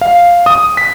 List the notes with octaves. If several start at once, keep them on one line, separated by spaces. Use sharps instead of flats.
F5
D#6
B6